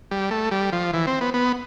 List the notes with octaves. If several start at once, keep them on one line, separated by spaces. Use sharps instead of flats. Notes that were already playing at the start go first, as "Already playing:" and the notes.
G3
A3
G3
F3
E3
C4
B3
B3